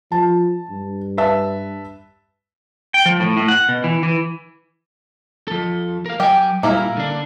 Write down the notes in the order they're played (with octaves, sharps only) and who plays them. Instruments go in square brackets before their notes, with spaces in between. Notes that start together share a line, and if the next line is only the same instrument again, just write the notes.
[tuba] F3 [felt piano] A5
[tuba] G2
[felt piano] B4 E5 A5
[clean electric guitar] G5
F3
A2
A2
F#5
B2
E3
E3
[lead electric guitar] F3 A4
A#4 F5
[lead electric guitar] F#3 G#5 [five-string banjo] G4 G5
[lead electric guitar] A#2 G3 [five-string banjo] A#3 E4 A#4
[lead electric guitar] D3 D4